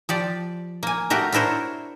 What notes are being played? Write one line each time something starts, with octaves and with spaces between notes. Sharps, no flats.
F3 G4 D5
A#3 G#5
A3 F#4 G4 A#4
D4 E4 A#4 C5 C#5